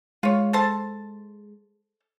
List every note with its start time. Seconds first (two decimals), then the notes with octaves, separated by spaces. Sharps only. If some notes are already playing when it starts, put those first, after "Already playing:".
0.23 G#3 F4 C#5
0.53 A4 C5 A5